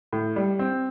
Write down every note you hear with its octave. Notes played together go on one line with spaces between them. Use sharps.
A2
G3
C4